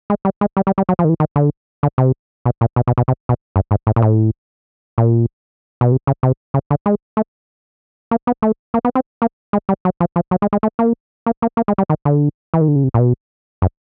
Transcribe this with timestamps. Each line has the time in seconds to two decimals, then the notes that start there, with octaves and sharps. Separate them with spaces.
0.10 G#3
0.25 G3
0.41 G#3
0.57 G3
0.67 G3
0.78 G3
0.89 F#3
0.99 F3
1.05 D#3
1.09 E3
1.20 D#3
1.36 D3
1.83 D3
1.98 C3
2.46 B2
2.61 A#2
2.76 B2
2.87 B2
2.98 B2
3.08 C3
3.29 B2
3.56 G2
3.71 G#2
3.87 A2
3.96 A#2
4.02 A2
4.98 A#2
5.81 B2
5.92 C3
6.07 C#3
6.23 C3
6.54 C#3
6.70 D3
6.86 G#3
7.17 A3
8.11 A#3
8.27 B3
8.42 A3
8.74 A#3
8.85 B3
8.95 C4
9.22 A#3
9.53 G#3
9.69 G3
9.85 F#3
10.00 F3
10.16 F3
10.31 F#3
10.42 G#3
10.53 G#3
10.63 A3
10.79 A#3
11.26 A#3
11.42 A#3
11.57 A#3
11.68 G#3
11.78 G3
11.90 D#3
12.05 D3
12.54 E3
12.61 D#3
12.68 D3
12.76 C#3
12.84 C3
12.94 A#2
12.99 B2
13.62 F#2